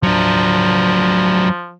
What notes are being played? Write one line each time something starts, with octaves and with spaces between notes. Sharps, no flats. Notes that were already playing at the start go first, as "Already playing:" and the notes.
F3 F#3 D4